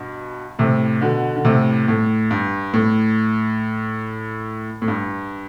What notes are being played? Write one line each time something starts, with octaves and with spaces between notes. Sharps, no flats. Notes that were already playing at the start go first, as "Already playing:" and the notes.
Already playing: G2 B2
A2 C3
B2 D3
D3
A2 C3
A2
G2
A2
A2
G2